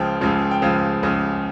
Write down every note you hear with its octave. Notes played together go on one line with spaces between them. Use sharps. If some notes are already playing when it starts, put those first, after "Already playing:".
Already playing: C#2 C#3 F3 G5
C#2 C#3 F3
G5
C#2 C#3 F3 F5
C#2 C#3 F3